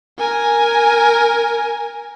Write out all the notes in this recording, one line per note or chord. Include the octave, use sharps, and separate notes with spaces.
A#4 G#5